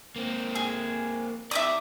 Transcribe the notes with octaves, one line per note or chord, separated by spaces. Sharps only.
A#3 C4
G#4
E4 D5 E5 D6 D#6